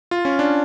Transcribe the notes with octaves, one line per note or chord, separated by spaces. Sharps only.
F4
C#4
D4